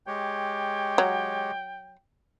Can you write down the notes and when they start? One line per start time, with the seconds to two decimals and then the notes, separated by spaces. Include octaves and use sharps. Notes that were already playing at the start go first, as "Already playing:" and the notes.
0.07 G#3 G4 C#5 G5
0.98 F#3